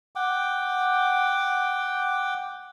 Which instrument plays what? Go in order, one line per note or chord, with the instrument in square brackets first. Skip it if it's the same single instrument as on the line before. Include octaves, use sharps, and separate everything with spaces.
[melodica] F#5 G5 D6